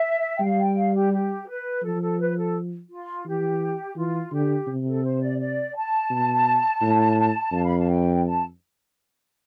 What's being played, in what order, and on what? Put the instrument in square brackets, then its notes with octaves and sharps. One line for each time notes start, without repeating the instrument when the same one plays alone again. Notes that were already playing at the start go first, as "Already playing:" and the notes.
Already playing: [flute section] E5
G5
[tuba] G3 [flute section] F5
[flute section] G5
F5
G4
G4
B4
[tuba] F3 [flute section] A4
[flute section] A4
B4
A4
F4
[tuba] E3 [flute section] G4
[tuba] E3 [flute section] F4
[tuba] D3 [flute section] G4
[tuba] C3
[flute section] A4
C5
D5
D5
A5
[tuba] B2
A2
[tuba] F2 [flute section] F5
[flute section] B5
A5
G5
A5